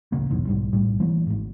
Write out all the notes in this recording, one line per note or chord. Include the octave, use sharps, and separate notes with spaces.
D1 A1 C#3 A#3
F#1 B1 E2 G#2
B1 G#2 G3
A#1 A2 G3
E3 F#3 A3 A#3
G#1 G#2